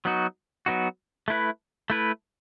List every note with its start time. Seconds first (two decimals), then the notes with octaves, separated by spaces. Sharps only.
0.05 F#3 B3 D#4 F#4
0.66 F#3 B3 D#4 F#4
1.28 A3 E4 B4
1.90 A3 E4 B4